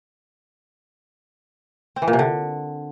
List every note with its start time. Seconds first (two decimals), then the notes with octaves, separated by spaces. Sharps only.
1.96 C4
2.02 E3
2.08 A#2
2.13 C3
2.19 D3